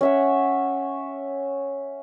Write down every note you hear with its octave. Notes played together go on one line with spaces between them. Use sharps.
C#4 E5 F#5